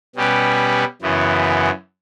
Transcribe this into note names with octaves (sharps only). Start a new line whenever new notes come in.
B2 G3 C#4 G4 B4
F#2 C#3 E3 B3